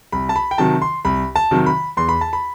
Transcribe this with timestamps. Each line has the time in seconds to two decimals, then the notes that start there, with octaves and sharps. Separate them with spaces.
0.12 C2 B5
0.29 A5
0.36 B5
0.51 G5
0.58 C3 D#3 F#3 A5
0.82 C6
1.05 C2 B5
1.36 A5
1.51 C3 D#3 F#3
1.66 B5
1.97 E2 C6
2.09 B5
2.21 A5
2.33 B5